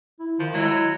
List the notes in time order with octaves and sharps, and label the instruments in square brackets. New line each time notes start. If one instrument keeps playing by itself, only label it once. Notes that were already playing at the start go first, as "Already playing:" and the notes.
[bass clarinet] E4
[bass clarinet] D#3 [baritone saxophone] F3
[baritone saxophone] F#3 [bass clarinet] G#3 [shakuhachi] E4